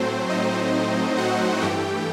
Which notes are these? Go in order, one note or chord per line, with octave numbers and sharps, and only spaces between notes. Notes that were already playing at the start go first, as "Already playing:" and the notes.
Already playing: A2 F#3 A3 C4 C5
D#4 D#5
F#4 F#5
G2 E3 A3 G4 G5